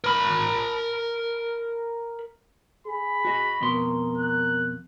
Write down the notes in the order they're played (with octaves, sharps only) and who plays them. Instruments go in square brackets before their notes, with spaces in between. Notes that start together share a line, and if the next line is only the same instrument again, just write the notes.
[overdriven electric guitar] A#4 B5
[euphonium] G#4 [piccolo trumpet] B5
[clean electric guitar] F#4 D#5
[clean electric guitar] F2 B2 C6 [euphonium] A#4
[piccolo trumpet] F#6